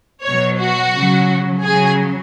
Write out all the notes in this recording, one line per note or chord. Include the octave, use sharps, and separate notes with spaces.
B2 F#3 C#5
F#4
C#3 F#3
C#3 F#3 G#4